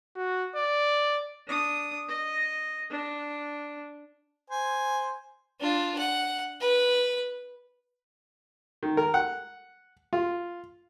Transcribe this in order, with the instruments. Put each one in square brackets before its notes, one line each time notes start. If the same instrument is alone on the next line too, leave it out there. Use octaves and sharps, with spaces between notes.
[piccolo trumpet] F#4
D5
[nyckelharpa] D4 D#6
D#5
D4
[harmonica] C5 G#5
[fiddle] D4 F4
F#5
B4
[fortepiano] D#3
A#4
F#5
F4